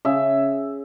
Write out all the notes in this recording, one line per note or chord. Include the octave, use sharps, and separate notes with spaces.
C#3 E5